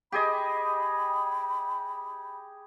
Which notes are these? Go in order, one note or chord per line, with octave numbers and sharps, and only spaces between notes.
G4 G#4 D#5 B5